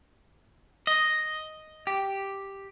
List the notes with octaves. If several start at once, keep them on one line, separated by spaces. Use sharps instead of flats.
D#5
G4